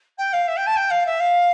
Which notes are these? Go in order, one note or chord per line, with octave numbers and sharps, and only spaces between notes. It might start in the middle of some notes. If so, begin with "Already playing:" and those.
G5
F5
E5
G5
A5
G5
F5
E5
F5